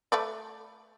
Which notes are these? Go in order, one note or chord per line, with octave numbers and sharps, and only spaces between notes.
A3 B4 D5